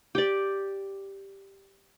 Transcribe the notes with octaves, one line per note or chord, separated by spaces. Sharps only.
G4 D5